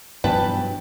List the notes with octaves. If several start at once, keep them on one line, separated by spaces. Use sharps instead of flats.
G2 B2 E3 F#3 B4 G5 A5 B5